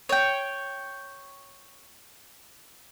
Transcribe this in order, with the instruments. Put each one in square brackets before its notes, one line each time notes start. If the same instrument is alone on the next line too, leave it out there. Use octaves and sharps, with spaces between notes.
[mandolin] C#5 G5